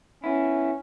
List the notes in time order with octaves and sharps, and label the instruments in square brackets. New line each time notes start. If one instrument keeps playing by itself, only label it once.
[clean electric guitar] B3 E4 [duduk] C#4